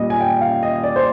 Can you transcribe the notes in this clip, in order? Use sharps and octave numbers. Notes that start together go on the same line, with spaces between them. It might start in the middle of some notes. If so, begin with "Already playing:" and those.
Already playing: A#2 G3 D#5
G#5
G5
F5
D#5
D5
C5